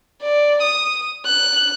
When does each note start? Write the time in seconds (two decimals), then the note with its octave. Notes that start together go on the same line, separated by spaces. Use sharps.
0.22 D5
0.62 D#6
1.26 F#6